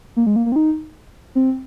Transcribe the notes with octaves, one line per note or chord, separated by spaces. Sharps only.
A#3
G#3
A#3
A#3
C4
D#4
C4